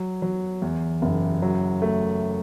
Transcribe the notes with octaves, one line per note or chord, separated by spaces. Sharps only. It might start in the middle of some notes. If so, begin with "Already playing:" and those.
Already playing: F#3
F#3
E2
F#1
F#3
A3